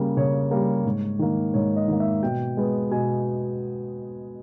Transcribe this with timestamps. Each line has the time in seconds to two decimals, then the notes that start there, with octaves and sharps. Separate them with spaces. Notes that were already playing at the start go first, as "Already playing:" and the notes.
Already playing: C#3 G3 A#3
0.17 C#3 C#5
0.51 G3 A#3
0.85 G#2
1.19 D#3 A#3
1.54 G#2 C#5
1.76 D#5
1.88 D#3 A#3
2.00 E5
2.22 B2 G5
2.57 G#3 B3
2.91 B2 G#5